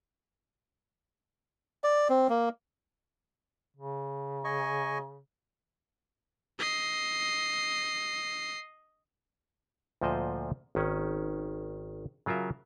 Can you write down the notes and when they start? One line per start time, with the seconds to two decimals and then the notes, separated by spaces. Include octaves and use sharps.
1.84 D5
2.09 C4
2.29 A#3
3.77 C#3
4.44 D#5 G#5 C#6
6.59 D#5 C7
10.01 D2 A#2 F3 C5 D#5
10.75 G#1 D#3 C#4
12.26 C#3 F#3 F4 A#4 E5